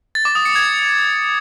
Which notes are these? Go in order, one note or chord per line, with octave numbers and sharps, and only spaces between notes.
A6
D6
D#6
C#7
G#6